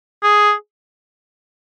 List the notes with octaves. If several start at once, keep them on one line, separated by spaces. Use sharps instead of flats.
G#4